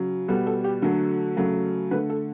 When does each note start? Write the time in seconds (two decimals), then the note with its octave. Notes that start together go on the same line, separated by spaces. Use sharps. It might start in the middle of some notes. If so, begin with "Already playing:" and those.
Already playing: C#3 F#3
0.28 B2 G3 B3 A4
0.46 A4
0.64 G4
0.82 D3 F#3 A3 A4
1.37 C#3 F#3 A3
1.91 D3 A3 B4
2.10 A4